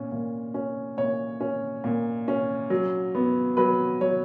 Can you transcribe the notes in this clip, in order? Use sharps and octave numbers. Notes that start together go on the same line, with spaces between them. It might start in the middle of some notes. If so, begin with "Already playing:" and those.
Already playing: A#2 C#4
A#2
C#4
A#2 C#5
C#4
A#2
C#4
F#3
B3
F#3 B4
F#3 C#5